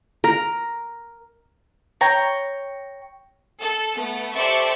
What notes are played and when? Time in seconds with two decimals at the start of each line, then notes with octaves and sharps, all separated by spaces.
0.24 A#4
2.01 C#5 G5 A#5
3.61 A4
3.96 A3 B3
4.34 G4 A4 C5 D5 E5 C#6